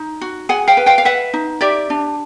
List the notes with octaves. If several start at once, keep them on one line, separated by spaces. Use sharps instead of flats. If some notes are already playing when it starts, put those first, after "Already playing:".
Already playing: D#4
F#4
G#4 F#5 G#5
F5 G5
B4
F5 G5
F5
B4 E5 F#5
D#4
G4 D5 E5
D4